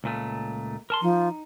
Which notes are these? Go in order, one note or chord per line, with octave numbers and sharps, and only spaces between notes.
C#2 A#2 A3
A#4 A5 C6
F3 D#4